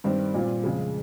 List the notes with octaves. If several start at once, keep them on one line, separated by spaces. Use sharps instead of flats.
G2 D#3 G3 C4
A#2 G3 C4 F4
F2 C#3 G#3